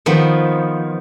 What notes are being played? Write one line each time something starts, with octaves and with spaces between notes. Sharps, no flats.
D#3 F3 B3